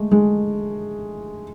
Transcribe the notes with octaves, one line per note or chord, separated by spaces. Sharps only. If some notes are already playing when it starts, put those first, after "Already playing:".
Already playing: G#3 A3
G#3